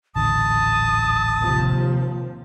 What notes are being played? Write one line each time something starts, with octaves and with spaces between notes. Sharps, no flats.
D#1 A1 D3 A5 D#6
D#2 C3 F3